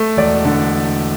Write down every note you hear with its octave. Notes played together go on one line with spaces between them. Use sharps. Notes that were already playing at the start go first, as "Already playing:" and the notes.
Already playing: A3
E1 D5
D3